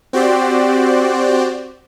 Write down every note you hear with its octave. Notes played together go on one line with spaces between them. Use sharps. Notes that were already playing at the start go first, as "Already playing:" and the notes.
C4 F#4 G4 C5 D5